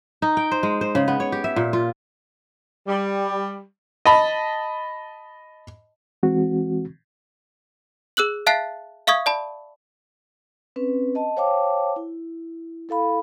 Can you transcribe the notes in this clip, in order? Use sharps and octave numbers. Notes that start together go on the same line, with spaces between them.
D#4
G5
C5
G#3
C5
C#3
B3
C#5
G4
E5
A#2
F4
G3
D#5 A5 B5
E3 G#3 C4 F#4
G#4 E6 F#6 F#7
E5 F5 A5 F#6 A6 C7
E5 F5 C#6 D#6 G#6
D5 A5 B5
C4 C#4 B4
D#5 A5
C5 C#5 F5 G5 A5 D6
E4
E4 A4 F5 B5